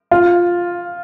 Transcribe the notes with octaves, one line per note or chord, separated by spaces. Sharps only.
F4